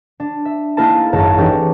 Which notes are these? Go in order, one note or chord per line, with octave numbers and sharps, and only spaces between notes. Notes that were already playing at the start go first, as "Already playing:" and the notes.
D4
E5
A#3 D#4 E4 A#4 G#5 A5
G#1 F#2 A#4 A5 A#5
E3 C#4 D#4 G4 A4 D5